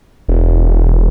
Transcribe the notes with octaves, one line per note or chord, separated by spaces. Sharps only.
E1